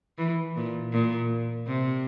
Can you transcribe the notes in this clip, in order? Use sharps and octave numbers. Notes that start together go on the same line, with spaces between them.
E3
A#2
A#2
C3